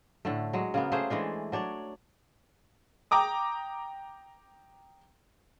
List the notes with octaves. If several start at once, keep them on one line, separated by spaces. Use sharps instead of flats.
A2 D3 A3
F#3 G#3
C#3 A#3 B3
A3 A#3 G#4 C5
E3 G#3 A3 D4
F#3 D4 C#5 D5
G5 A#5 D6 D#6